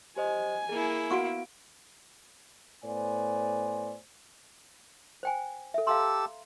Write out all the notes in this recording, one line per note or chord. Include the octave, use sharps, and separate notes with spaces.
G4 C5 D#5 G#5
A#3 E4 G#4
B3 F#4 F5 F#5 C#6 D7
A2 B3 C5 D5 G#5
C5 G5 G#5
A4 E5
G4 A4 F5 A#5 C6 E6